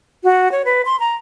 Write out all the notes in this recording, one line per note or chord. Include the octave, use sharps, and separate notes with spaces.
F#4
C#5
B4
C6
A#5